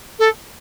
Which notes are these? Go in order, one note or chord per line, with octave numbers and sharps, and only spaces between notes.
A4